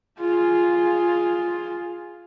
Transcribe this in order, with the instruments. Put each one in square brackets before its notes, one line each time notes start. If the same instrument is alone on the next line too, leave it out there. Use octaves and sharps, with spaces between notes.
[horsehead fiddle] F4 G#4